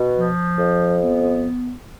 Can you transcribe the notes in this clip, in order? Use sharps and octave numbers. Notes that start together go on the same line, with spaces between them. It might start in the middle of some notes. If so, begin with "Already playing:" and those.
Already playing: B2
F3
F2
B3